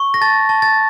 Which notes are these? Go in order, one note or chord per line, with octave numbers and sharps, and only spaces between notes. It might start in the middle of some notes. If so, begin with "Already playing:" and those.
Already playing: C#6
A#6
A5 A6
A5
A6